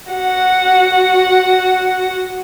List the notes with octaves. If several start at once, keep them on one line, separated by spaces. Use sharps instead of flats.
F#4 F#5